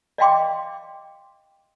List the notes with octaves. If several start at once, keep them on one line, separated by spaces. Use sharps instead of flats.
D5 D#5 F5 G5 C6 D6